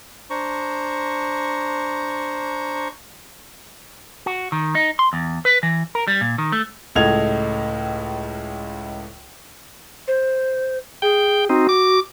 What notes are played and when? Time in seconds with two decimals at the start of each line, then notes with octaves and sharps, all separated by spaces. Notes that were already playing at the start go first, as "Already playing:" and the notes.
0.30 D4 C5 A#5 C#6
4.26 F#4
4.52 D#3
4.75 D#4
4.99 C6
5.13 E2
5.45 B4
5.63 E3
5.95 A#4
6.08 G3
6.21 A#2
6.38 D#3
6.52 A3
6.95 C#2 A2 A4 D#5 G#6 F7
10.08 C5
11.02 G#4 G5
11.49 C4 D#4 F#4
11.69 D6